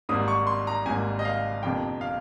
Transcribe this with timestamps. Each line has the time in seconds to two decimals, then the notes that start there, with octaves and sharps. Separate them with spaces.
0.09 G#1 G#2 G3 A#3 D#6
0.28 C#6
0.47 C6
0.67 A#5
0.85 G#1 G#2 G3 A#3 G#5
1.19 D#5
1.25 F5
1.63 G1 F2 C3 F3 A#3 G5
2.01 F5